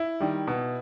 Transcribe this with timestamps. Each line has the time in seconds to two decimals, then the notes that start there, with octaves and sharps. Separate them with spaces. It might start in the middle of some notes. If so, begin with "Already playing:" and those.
Already playing: E4
0.20 D#3 G3
0.47 B2